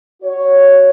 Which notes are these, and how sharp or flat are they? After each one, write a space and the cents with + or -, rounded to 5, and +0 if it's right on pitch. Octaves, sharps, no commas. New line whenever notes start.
F#4 +10 C#5 +0